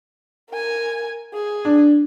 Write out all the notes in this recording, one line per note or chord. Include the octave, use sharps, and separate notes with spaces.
A#4 G#5
G#4
D4